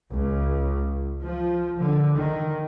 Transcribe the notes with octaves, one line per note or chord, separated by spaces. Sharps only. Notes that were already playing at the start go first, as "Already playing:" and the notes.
C#2
F3
D3
D#3